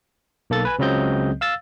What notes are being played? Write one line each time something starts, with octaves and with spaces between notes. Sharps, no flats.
B1 A#3 A4 A6
B4 G#5
C#2 C#3 F#3 C4 D#5 G6
F5 E6 A6